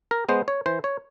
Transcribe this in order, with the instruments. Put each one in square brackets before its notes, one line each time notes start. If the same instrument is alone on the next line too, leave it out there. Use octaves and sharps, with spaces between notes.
[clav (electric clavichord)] A#4
G#3 B3 C5
C#5
E3 C5
C#5